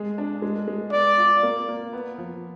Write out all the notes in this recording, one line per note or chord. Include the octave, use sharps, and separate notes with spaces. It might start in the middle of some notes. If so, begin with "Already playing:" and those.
Already playing: G#3 G#4
D4
G#3
G#3
B3 D5
F4
A#3
A#3
B3
F3